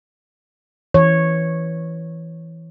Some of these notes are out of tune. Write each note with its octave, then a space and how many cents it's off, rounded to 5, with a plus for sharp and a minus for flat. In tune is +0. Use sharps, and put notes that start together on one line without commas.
E3 +0 C#5 -10